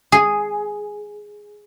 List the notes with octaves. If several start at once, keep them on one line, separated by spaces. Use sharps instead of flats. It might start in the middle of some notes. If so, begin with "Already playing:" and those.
G#4